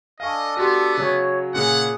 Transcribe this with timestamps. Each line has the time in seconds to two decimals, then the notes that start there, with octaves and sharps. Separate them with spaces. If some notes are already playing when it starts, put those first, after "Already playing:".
0.20 D4 A4 D#5 F5 G#5 C#6
0.57 B3 F#4 G4 C6
0.97 C#3 F#3 C#5
1.54 A#2 C#3 G#4 F#5